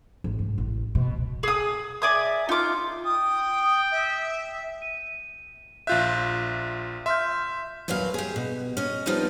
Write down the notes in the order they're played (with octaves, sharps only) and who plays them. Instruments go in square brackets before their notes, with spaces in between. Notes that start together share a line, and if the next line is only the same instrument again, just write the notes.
[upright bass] G#1
G#2
A1
B2
[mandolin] G#4 D#6
[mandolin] D5 G#5 D#6 [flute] E5
[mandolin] D#4 D6 [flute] F4
[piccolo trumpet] G5 [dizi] D#6
[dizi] E5
[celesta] D#7
[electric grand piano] A#1 F4 E5 [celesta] F#6 G6
[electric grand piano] E5 [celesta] C6 F6 G6
[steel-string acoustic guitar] D#2 A#2 F#3 B4 F5
G4 G#4
B2
C#4 D#5
F3 G3 B3 C4 D#4 F4